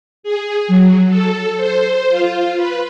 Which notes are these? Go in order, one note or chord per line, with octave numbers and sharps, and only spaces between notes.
G#4
F#3
A4
C5
F4
B4